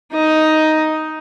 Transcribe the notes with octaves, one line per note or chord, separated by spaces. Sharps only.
D#4 D#5